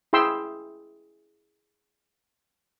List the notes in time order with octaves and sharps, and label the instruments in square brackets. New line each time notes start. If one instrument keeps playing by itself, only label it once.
[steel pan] E4 G#4 G5 C6 E6